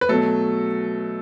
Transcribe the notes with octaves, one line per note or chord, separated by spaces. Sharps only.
B4
B2 F#3 A3 A4